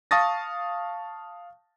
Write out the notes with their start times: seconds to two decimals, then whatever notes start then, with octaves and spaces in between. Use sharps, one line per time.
0.11 F5 A5 C#6 D#6 A6 A#6